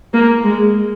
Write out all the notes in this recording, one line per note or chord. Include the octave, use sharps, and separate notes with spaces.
A#3
G#3